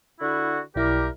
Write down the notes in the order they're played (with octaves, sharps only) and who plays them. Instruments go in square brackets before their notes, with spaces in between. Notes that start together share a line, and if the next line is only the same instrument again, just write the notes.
[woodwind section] D3 E4 F#4
[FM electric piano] B1 E4 [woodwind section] G3 G4 A#4